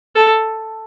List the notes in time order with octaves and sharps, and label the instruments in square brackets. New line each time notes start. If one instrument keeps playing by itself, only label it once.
[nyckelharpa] A4